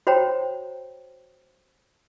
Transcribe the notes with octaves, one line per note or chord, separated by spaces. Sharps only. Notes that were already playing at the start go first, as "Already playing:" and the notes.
F#4 C5 C#5 G5 A#5